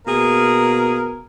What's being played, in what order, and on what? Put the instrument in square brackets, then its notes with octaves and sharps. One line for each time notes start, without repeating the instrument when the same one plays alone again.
[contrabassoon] B2 [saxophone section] A#3 G#4 [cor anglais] A#4